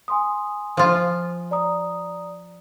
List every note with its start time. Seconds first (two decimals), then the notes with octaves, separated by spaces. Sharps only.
0.08 G#5 C6 D#6
0.77 F3 F4
1.51 D5 A#5 D#6